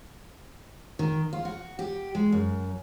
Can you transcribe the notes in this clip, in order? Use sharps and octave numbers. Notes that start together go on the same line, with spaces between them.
D#3
F4
F#4
G4
G#3
F#2